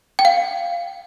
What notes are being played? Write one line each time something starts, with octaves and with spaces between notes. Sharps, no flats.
G5
F5